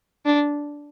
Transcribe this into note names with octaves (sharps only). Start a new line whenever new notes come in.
D4